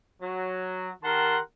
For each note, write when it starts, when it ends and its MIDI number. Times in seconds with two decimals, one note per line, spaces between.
0.22 0.91 54
1.03 1.38 51
1.03 1.38 67
1.03 1.38 70
1.03 1.38 78
1.03 1.38 81
1.03 1.38 84